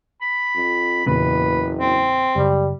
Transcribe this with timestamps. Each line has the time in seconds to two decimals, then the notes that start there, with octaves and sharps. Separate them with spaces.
0.22 B5
0.55 F2
1.06 F#1 E2 A#2 C#3 B4
1.78 C4
2.36 F#1 G3